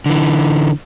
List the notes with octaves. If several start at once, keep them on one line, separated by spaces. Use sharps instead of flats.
D3 E3